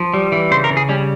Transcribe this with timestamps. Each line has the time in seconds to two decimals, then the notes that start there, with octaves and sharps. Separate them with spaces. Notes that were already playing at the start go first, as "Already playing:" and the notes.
Already playing: F3
0.14 G3
0.32 E3
0.51 C#3 C5
0.64 A#4
0.70 C#3
0.77 G#4
0.89 G3 C#4